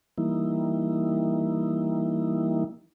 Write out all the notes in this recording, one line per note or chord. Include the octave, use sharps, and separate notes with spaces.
E3 G3 A#3 D#4 E4